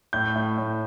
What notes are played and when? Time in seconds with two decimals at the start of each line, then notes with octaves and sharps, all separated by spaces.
0.13 A2 G6
0.36 A2
0.58 A2